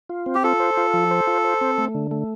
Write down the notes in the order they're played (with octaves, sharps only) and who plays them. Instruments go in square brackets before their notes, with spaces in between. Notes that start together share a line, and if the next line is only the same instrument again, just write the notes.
[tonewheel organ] F4
C4
[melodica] G4
[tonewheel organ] F4 [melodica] A4
[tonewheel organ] C5
F4
F3
C5
F4
C5
C4
A3
D3
A3